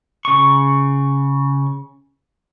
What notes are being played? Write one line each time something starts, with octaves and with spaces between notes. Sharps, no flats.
C#3 C#6